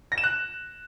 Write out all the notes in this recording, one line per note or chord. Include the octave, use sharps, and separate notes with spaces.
A#6
E7
F#6